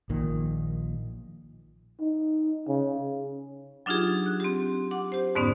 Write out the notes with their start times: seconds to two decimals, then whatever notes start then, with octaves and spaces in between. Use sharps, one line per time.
0.09 A#1 A#2 D#3
2.00 D#4
2.68 C#3
3.86 F#3 D4 D#4 F4 G4 G#4
4.26 F#6
4.40 C4 G4
4.91 F#5 D6
5.12 G4 C5
5.35 F2 G#2 D3 B3 C#4 D#4